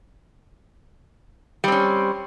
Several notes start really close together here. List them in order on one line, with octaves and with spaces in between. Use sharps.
G3 C4 C#4